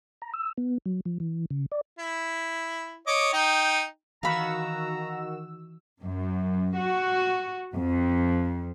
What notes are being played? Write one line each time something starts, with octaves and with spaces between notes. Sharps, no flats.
A#5
E6
B3
F#3
F3
E3
C#3
D5
E4
C#5 D#5 D6
D#4 G5
D#3 E3 F#4 F5 A#5 B5 E6
F#2
F#4
F2